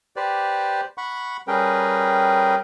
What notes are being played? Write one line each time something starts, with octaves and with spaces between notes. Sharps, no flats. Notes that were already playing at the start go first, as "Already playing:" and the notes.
G4 B4 C5 D5
F#5 B5 C#6
G3 C#4 G#4 A#4 B4 G5